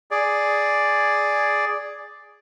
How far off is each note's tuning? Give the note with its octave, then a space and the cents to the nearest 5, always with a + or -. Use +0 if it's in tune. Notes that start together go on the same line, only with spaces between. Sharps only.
G#4 +0 D5 +0